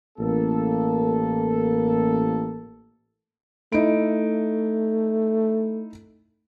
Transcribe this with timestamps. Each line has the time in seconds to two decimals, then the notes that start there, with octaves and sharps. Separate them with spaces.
0.19 A1 A#3 A4
3.72 A3 D#4 E4 D7